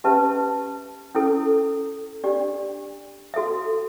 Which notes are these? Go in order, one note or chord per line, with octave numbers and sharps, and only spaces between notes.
C#4 G4 B4 E5 A5
C#4 E4 A4
D4 G4 D5
F#4 A4 E5